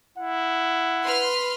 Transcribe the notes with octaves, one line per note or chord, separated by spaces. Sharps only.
E4 F#5
B4 C6 F6